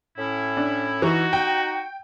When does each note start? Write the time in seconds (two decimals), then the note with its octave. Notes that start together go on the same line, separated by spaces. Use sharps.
0.17 A2 C#4 E4
0.57 D4
1.02 E3 D#4 F#4
1.33 G5